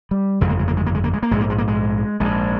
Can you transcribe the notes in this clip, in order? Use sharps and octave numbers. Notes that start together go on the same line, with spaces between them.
G3
G1 F2 C#3 G#3
A#3
G#3
A#3
G#3
A#3
G#3
A#3
G#3
A#3
A#1 G#2 G#3
A#3
G#3
A#3
G#3
A#1 G#2 G#3